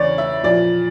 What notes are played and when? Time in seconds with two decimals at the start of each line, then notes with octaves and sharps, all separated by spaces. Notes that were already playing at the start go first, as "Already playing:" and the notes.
Already playing: E2 C#3 E3 C#5 D5
0.18 E5
0.43 A#2 F3 D5